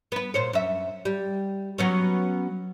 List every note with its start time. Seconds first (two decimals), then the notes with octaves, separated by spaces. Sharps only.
0.12 B3 B4
0.34 A#2 C5 C#5
0.53 F#2 E5
1.05 G3
1.78 F#3 B3 C#4